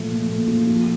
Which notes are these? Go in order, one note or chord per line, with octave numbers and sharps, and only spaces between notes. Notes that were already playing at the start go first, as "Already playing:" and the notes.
Already playing: A#2 F3 A3
A#2
A#2
F3
F4